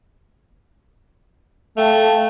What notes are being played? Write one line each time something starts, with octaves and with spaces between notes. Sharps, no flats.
A3 F5 G5 A5